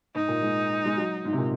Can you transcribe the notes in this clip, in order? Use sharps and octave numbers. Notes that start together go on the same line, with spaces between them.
G#2 D#4
A#2
G#3
G#3
F#3
G#2
C3
A#2